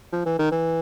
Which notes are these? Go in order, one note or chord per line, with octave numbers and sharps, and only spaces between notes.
F3
E3
D#3
E3